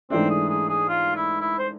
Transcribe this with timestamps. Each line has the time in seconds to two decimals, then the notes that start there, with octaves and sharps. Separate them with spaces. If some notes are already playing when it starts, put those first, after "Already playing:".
0.10 G#2 E3 A3 C4 D4
0.30 G#4
0.49 G#4
0.69 G#4
0.89 F4
1.16 E4
1.41 E4
1.58 C5